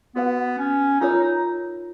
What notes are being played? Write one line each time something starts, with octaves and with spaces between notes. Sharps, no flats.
B3 F#4 B4 F#5
C#4
D#4 F4 A#4 C#5
D#4